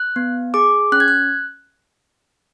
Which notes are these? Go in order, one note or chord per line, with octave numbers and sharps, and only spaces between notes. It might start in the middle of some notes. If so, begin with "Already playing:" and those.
Already playing: F#6
B3
G#4 D6
C#4 F#6
G#6
F#6